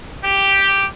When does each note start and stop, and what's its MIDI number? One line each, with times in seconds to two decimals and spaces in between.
0.24 0.85 67